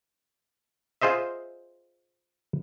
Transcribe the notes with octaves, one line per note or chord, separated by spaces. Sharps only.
F4 G#4 C5 D#5 E5